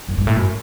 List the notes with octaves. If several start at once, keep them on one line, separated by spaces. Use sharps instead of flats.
F#2
G2
A2
F#2